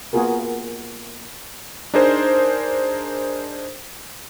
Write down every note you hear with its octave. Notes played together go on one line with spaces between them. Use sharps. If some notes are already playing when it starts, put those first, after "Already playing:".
A#3 B3 F4 F#4 G#4 A#4
D4 D#4 G#4 A#4 C5